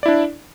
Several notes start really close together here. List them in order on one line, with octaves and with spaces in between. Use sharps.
D5 E4 D4